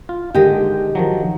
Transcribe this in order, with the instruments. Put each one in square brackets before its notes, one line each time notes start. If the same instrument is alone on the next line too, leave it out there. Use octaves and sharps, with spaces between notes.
[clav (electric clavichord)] F4
[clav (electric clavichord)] D3 D#3 G#3 [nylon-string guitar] G4 D#5
[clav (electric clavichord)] D#3 F3 F#3